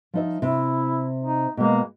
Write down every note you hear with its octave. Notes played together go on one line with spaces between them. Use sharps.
F3 D#4 E5
C3 E4
D#4
B2 G#3 A#3